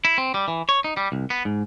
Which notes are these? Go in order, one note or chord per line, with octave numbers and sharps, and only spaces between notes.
E4
C4
G3
E3
C#5
D#4
G3
C2
B3
G#2